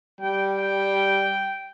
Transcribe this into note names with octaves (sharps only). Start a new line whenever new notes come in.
G3 G5
G5